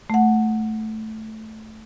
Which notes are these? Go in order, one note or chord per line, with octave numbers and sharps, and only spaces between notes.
A3 F#5